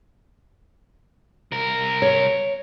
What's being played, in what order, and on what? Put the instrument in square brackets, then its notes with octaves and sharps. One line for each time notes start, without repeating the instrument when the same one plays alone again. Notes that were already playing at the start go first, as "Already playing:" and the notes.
[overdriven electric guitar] C2 A#4
[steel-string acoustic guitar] C#5